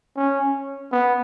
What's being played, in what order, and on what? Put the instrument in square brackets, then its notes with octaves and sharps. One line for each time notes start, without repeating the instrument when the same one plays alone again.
[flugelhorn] C#4
B3